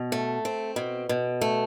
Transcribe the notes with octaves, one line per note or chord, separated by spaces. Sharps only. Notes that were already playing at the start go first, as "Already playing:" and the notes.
Already playing: B2
A3
C4
B2
B2
A3